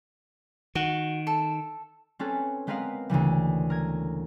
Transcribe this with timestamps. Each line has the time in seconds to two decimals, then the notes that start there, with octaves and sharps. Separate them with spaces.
0.75 D#3 F#4
1.27 A4
2.19 C4 C#4 A4 B4
2.67 G#3 B3 C4 A#4 B4 F5
3.10 D2 C#3 E3 G3
3.70 A#4 G#6